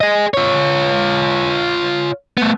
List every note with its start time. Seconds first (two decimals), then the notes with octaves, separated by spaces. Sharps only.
0.01 G#4 D#5
0.34 F4 C#5
2.37 A3 B3